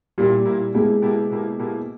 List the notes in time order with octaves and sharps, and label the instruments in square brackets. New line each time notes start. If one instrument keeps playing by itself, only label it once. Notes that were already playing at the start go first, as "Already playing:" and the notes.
[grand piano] A#2 A#3 E4 [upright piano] G3
[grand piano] A#2 A#3 E4
[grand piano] B2 A#3 E4 G4 [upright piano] G#3
[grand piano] B2 A#3 E4 G4
B2 A#3 E4 G4
B2 A#3 E4 G4